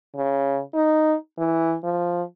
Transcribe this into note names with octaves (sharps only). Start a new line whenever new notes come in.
C#3
D#4
E3
F3